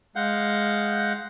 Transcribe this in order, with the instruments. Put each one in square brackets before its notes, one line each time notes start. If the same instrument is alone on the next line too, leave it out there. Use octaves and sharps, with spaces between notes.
[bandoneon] G#3 F5 F#5 G6